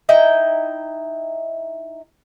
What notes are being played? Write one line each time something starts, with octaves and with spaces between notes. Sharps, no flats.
D#4 E4 G5